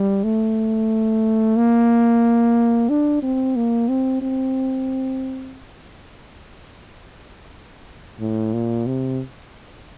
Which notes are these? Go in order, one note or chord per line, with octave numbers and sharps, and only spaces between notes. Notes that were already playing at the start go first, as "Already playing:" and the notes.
Already playing: G3
A3
A#3
D4
C4
A#3
C4
C4
A2
A#2
C3